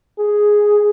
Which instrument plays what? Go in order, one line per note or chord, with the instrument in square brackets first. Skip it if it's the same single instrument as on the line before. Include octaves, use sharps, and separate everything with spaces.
[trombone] G#4